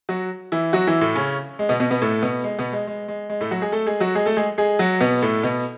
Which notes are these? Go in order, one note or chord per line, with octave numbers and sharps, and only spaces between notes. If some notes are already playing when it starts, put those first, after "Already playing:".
F#3 F#4
E3 E4
F#3 F#4
E3 E4
A2 A3
C#3 C#4
G#3
B2 B3
B2 B3
B2 B3
A2 A3
B2 B3
G#3
B2 B3
G#3
G#3
G#3
G#3
A2 A3
F#3 F#4
G#3 G#4
A3 A4
G#3 G#4
F#3 F#4
G#3 G#4
A3 A4
G#3 G#4
G#3 G#4
F#3 F#4
B2 B3
A2 A3
B2 B3